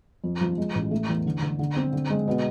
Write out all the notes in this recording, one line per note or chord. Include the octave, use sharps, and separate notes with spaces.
F2
F3
G#3
A1
A3
E2
D3
D3
D3
C4
D3
G#3
B2